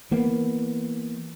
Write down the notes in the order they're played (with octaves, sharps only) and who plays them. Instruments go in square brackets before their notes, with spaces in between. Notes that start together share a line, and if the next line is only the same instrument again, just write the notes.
[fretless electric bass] E3 A#3 B3